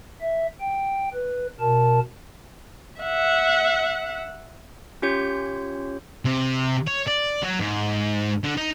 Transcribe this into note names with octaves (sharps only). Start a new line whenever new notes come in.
E5
G5
B4
B2 A#4 A5
E5 F#5
C#4 F4 G4 C#5 G6
C3
C#5
D5
F#3
G#2
D3
D#4